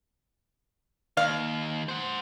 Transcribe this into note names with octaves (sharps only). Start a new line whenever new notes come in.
D#2 F5
C5 F#5